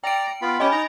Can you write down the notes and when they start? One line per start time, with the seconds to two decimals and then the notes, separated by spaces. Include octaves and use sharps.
0.04 D5 G5 A#5 D7
0.42 B3 F4 B5
0.60 C#4 G4 D#5 G#5 B5
0.72 D#4 A#5